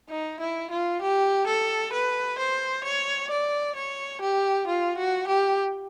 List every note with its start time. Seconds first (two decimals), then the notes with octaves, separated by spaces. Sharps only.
0.10 D#4
0.40 E4
0.71 F4
1.02 G4
1.47 A4
1.93 B4
2.38 C5
2.84 C#5
3.30 D5
3.76 C#5
4.21 G4
4.67 F4
4.98 F#4
5.28 G4